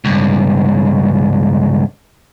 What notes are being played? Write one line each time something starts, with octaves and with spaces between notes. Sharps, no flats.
C#2 G2